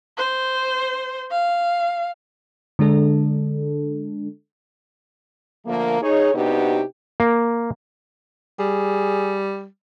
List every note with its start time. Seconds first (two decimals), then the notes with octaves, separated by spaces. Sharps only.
0.18 C5
1.31 F5
2.79 D3 G#3 D4 A4
5.66 D3 F3 A3 A#3
6.01 D#4 G#4 C#5
6.35 C3 B3 D4 D#4 F#4 G4
7.20 A#3
8.59 G3 G#4